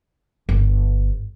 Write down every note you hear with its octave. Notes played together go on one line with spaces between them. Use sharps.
G1